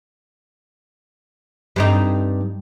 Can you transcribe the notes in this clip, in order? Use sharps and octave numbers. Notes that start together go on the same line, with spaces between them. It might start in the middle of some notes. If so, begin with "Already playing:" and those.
G2 C4 D#4